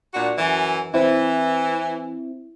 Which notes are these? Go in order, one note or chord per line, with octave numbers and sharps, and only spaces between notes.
A#2 D4 F#4
F#2 E3
E3 C4 E4